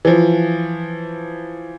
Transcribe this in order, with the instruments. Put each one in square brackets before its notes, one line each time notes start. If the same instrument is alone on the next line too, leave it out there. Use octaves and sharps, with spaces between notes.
[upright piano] E3 F3